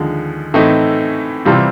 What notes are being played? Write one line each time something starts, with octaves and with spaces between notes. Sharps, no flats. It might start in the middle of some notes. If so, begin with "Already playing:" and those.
Already playing: D#2 D3 F3 G#3
A2 E3 A3 C4 D#4
C3 E3 G3 C4 F4